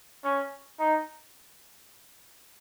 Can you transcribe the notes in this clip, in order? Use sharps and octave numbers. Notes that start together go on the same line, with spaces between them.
C#4
D#4